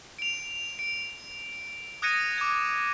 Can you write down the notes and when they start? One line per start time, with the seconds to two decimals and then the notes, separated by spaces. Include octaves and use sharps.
0.19 D7 F7
0.79 D7
2.02 D#6 F#6 G#6 A#6 C#7 D#7
2.38 D6 G#6